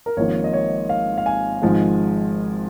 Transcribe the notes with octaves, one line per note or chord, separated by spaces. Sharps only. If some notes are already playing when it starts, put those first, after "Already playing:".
A#4
G#1 G#2 F3 A#3 C#5
D#5
C#5
F5
F5
G#5
G#1 G#2 F3 G#3